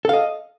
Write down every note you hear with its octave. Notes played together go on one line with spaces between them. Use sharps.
A4 D#5 F5